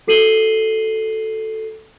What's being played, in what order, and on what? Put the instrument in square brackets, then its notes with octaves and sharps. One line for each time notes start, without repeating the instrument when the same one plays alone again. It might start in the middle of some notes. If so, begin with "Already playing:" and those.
[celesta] F#4 A4 C7 D#7 F#7 G7